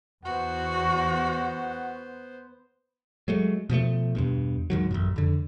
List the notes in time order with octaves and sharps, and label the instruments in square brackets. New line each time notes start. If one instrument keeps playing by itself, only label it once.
[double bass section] E2 [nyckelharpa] B3 C5 [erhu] F#4 [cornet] F#5
[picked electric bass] F#3 G#3 A3
B2 F3 F#3 A3
E2 G2 B2
E2 G#2 D#3 F#3
A1 F#2 A#2
F2 D3